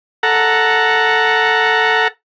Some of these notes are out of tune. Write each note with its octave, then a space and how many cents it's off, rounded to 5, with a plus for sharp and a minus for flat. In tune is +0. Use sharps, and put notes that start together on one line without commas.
A4 +5 F#5 -5 A#5 +0